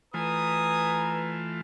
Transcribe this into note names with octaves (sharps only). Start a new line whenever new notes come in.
E3 A3 F4 B4 G#5 A#5 D#6